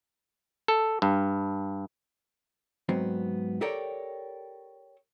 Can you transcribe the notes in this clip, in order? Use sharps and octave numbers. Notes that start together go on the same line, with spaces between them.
A4
G2
G#2 F#3 B3 C4
G4 A4 A#4 C#5 D5 G5